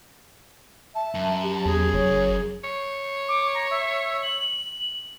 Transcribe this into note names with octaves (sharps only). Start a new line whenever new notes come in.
E5 A5
F#2
G4
E2 G#4
F#1 C#5
C#5
D6
A#5
E5
F#7